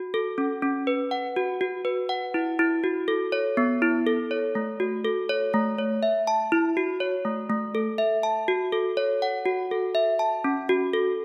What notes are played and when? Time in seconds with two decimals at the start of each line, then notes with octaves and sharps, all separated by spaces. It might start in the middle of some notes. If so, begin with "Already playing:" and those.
Already playing: F#4
0.14 A4
0.38 C#4
0.62 C#4
0.87 B4
1.11 F#5
1.36 F#4
1.61 F#4
1.85 B4
2.09 F#5
2.34 E4
2.59 E4
2.84 F#4
3.08 A4
3.32 C#5
3.57 B3
3.82 E4
4.07 A4
4.31 C#5
4.55 A3
4.80 F#4
5.05 A4
5.29 C#5
5.54 A3
5.78 C#5
6.03 E5
6.27 A5
6.52 E4
6.77 F#4
7.00 C#5
7.25 A3
7.50 A3
7.75 A4
7.98 E5
8.23 A5
8.48 F#4
8.72 A4
8.97 C#5
9.22 F#5
9.46 F#4
9.71 A4
9.95 E5
10.19 A5
10.44 C#4
10.69 F#4
10.93 A4